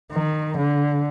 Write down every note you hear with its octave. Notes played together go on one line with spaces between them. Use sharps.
D#3
D3